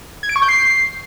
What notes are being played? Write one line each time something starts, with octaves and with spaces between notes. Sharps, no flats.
G#6
D7
C#6
G6
C7